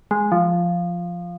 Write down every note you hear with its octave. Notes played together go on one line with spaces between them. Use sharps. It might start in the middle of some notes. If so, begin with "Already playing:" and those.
G#3
F3